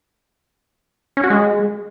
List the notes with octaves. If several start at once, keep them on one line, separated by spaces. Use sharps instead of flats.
C#4
F#4
G#3